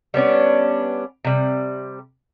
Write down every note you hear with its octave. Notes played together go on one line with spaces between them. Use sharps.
G3 B3 C#4 D4
C3 G3